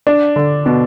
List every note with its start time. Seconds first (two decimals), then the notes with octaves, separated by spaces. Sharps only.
0.07 D4
0.36 D3
0.66 B2